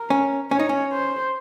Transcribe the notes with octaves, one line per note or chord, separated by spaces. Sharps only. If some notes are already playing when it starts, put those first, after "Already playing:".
Already playing: A#4
C#4
C#4 C#5
D#4
C#4
C5